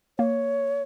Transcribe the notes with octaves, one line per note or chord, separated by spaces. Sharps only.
A#3 C#5